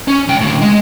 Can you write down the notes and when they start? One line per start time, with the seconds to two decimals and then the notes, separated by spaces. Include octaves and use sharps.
0.08 C#4
0.28 C#2 G5
0.40 A2 D3
0.61 G#3